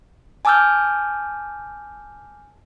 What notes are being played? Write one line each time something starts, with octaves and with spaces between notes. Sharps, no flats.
G#5 A5 D6 E6 F6 G6